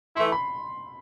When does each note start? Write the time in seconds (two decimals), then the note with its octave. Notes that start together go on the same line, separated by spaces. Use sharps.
0.17 E3 A3 E4 C6
0.32 B5